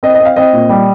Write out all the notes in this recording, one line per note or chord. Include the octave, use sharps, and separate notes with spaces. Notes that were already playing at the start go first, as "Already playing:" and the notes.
C4 D#5
D#5
C4
F5
C4 D#5
A#2
G3